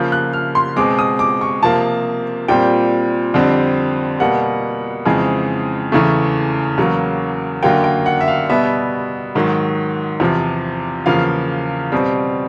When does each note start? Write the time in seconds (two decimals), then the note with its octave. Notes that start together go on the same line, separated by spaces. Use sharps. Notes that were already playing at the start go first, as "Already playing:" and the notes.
Already playing: C#3 F3 A#3 G6
0.12 F#6
0.33 F6
0.55 C6
0.76 B2 G#3 C4 D6
0.99 D#6
1.19 D6
1.41 C#6
1.63 C3 F3 A#3 A5
2.48 A#2 G3 C4 G5
3.34 F2 D3 G3 C4
4.20 B2 G3 A#3 F#5
5.06 F2 C#3 E3 G#3 C4
5.92 E2 C#3 E3 A3
6.78 E2 C#3 F#3 A#3
7.63 F#2 D3 F#3 A#3 G5
7.84 G5
8.06 F#5
8.21 E5
8.28 F5
8.49 B2 G3 B3 E5
9.35 G#2 D#3 F#3
10.20 E2 C3 F3
11.06 E2 C#3 F3 A#3 F5
11.92 B2 G3 C4